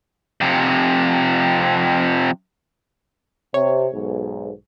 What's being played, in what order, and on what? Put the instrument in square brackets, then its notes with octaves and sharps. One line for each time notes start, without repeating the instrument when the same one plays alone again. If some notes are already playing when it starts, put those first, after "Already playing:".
[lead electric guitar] F2 C3
[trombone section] C3 [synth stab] C#5
[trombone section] B1 G#2